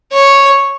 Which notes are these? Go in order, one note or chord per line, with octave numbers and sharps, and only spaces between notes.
C#5